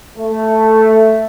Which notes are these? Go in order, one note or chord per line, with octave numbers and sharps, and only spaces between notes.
A3